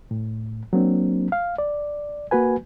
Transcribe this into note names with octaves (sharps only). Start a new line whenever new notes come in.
A2
F#3 A#3 C4 D4
F5
D5
A#3 F#4 B4 G#5